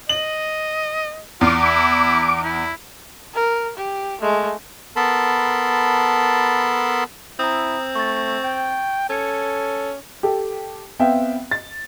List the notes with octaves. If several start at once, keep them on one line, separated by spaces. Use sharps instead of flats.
D#5 F#7
E2 F4 D6
E4
E4
A#4
G4
G#3 A3
B3 A4 A#4 A5 B5 C6
C4 E4 A#5 D#6
A3 C#6 A6
G5
C#4 A4 G#6 C#7
G4 A4
B3 C4 E5 F5 G5
A6